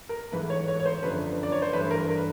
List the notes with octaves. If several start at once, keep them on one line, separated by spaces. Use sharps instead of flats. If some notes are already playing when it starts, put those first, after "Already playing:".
A#4
G#2 E3 A3 B4
C#5
C#5
C#5
C5
F#2 D3 F3 A3 B4
D5
C#5
C5
G2 E3 A3 B4
A#4
A#4
B4